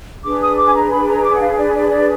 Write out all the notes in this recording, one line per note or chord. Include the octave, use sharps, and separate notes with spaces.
D4 G#4 B4 D6
D#6
D6
G#5
A#5
B5
A#5
D6
F#5
F5
D5
D5
D5